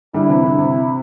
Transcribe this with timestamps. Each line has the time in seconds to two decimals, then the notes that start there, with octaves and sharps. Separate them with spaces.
0.14 D3 G3 E4
0.29 C3 E3
0.44 D3
0.58 C3